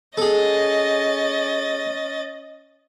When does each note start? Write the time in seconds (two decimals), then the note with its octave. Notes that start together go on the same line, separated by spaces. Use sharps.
0.17 C#4 G#4 A4 D#5 A6